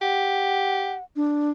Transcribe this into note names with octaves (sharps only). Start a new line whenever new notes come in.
G4 F#5
D4